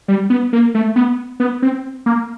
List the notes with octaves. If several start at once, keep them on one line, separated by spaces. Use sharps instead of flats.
G3
B3
A#3
A3
B3
B3
C4
A#3